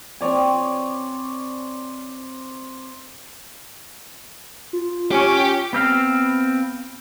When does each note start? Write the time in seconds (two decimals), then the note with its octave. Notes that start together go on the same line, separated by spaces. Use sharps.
0.21 C4 C#5 D5 G#5
4.73 F4
5.11 C#4 G4
5.73 B3 C4 F5